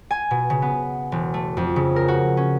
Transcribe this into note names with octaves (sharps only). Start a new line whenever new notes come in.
G#5
B2
C#3
B3
E1
A3
F2
C#3
A#4
F#4
C#4